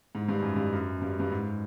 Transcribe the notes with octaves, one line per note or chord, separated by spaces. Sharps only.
G#2
G2
F#2
G2
F#2
G2
G2
G#2